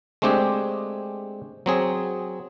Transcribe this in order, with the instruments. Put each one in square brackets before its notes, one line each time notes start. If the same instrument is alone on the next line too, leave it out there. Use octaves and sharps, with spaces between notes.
[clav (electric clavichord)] G#3 A3 C4 D4 G4 G#4
F#3 C4 G#4